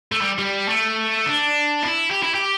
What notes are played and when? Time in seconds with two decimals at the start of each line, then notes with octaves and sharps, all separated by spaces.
0.12 A3
0.21 G3
0.39 G3
0.69 A3
1.26 D4
1.83 E4
2.11 G4
2.23 E4
2.35 G4